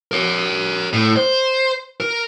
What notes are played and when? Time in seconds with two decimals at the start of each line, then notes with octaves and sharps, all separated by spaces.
0.12 A#4 C#5
0.93 A2
1.16 C5
2.00 A#4